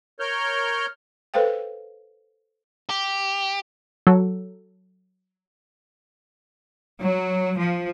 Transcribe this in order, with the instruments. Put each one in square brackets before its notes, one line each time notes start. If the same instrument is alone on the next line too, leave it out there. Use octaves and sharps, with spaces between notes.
[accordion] A#4 C#5 F6 G6
[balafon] A4 B4 C5 F5 G5
[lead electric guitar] G4
[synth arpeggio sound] F#3 A4
[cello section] F#3
F3